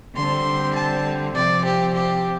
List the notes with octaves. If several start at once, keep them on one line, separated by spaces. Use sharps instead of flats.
D3 G3 C4 C6
A5
C3 F3 C4 D5
G4
G4